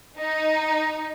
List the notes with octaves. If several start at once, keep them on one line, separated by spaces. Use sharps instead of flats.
D#4